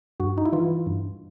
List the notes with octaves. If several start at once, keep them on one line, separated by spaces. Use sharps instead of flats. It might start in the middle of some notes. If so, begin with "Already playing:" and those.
G2 F#4
D#4
E4
E3 F4
G2